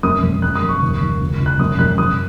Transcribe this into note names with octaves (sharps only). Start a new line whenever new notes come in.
F#2 D#6
F#2
F#2 F#6
D#6
F#2
C#6
D#2
D#2
C#2
C#2
F#6
F#2 D#6
F#2 F#6
F#2 D#6